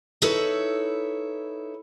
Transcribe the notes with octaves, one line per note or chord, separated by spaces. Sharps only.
D#4 E4 A4 B4 C#5